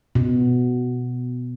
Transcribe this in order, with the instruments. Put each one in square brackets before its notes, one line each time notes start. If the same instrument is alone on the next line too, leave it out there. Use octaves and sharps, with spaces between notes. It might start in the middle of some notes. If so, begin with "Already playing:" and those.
[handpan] B2